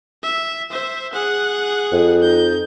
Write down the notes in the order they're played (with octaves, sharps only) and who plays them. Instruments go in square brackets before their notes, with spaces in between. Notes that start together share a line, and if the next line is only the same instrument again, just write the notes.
[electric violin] E5
C5 E5
G#4 F#5
[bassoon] F2
[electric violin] D#4 G6